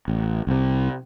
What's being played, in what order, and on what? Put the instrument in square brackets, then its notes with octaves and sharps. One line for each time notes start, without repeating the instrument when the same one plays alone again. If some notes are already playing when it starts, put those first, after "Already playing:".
[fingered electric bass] A1
C2 C3